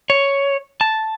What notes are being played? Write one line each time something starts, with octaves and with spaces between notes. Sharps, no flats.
C#5
A5